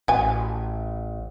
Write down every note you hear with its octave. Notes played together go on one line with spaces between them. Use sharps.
A1 F#4 G#5